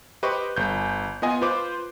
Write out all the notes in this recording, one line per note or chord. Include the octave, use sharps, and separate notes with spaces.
G4 B4 C5 D#5 C#6 D6
G1 G6
B3 F4 D#5 G#5
F4 B4 C5 D6